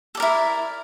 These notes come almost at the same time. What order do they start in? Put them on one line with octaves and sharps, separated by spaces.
A4 D5 A#4 E4